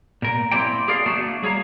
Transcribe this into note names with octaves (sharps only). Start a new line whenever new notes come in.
A#2 A#4
A#3 C4 E4 G4 D5 G5
G4 G#4 A#4 D5 F5
A3 A#3 D4 F#4 D5
G3 G#4 C#5 F5 A#5